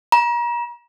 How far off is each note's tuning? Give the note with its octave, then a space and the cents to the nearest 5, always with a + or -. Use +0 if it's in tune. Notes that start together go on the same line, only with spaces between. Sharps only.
A#5 +40